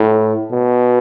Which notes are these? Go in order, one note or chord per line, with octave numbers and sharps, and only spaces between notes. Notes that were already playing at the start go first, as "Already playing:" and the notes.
Already playing: A2
B2